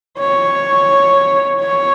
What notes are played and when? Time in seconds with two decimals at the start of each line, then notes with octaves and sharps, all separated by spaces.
0.19 C#5
1.61 C#5